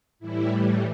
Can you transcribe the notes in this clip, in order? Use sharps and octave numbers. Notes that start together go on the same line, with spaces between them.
A2 E3 G3 E4